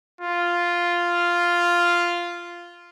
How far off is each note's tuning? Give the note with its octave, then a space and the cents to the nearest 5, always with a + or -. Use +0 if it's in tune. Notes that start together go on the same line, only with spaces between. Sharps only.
F4 -5